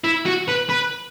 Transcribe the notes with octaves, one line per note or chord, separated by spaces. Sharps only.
E4
F#4
B4
B4